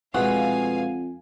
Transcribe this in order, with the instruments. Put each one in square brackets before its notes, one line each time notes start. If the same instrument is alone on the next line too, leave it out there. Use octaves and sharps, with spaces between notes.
[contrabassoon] F2 [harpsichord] B2 G#3 A3 [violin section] F5 G#5 [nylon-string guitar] F#5